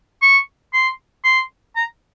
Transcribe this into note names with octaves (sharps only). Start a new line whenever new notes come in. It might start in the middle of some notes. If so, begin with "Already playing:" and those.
C#6
C6
C6
A#5